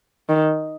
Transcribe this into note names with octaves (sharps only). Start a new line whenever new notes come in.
D#3